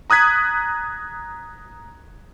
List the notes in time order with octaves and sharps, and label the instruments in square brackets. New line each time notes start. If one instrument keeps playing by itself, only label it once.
[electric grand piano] A#5 D#6 F#6 G#6 B6